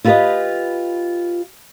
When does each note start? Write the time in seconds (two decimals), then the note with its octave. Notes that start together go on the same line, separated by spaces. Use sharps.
0.05 E4 F4 G4 A4 B4 D#5